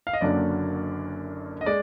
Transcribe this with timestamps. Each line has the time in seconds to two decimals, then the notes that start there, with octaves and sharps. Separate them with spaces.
0.07 F5
0.13 D#5
0.21 F#1 F#2 D3 F#3 A#3 D5
1.61 D#5
1.66 G#3 D5